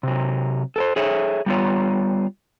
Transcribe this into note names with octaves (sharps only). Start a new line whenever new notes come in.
C3 F#3
A4 A#4 C5
G#4 A4 C#5 E5
G3 B3 D#4 F4 C#5